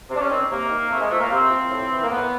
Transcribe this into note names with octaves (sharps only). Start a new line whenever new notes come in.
C3
D4
C#4
D#3 C4
C3 A#3
D#3
C3 A3
G#3
F3 A3
A#3
C3 C4
F3
A2
E3
A#3
A2 B3